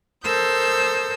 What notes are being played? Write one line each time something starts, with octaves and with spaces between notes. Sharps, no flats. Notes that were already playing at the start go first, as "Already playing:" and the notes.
A4 A#4 C5 D#6 E6 G6